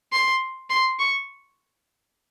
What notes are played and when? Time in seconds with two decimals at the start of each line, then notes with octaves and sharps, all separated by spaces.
0.12 C6
0.70 C6
0.99 C#6